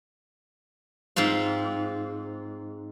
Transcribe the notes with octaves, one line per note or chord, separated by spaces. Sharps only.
G#2 C4 F4 F5